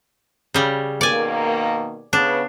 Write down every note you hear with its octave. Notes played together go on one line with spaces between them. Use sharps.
C#3 G3
B2 D#3 A#3 D5 G#5
C#3 B3 D4